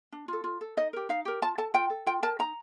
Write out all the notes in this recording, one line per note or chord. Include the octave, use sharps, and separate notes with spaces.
D4
F4 A4
F4
A4
D#4 D#5
G4 A#4
D#4 F5
G4 A#4
F4 A5
A4 A5
F4 G5
A4
F4 G5
A#4 A5
D#4 A#5